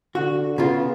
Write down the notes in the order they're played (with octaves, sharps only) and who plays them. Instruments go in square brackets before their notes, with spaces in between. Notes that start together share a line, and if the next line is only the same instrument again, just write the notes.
[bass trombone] D3 [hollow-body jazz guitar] F#4
[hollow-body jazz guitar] C#3 F4 [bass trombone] B3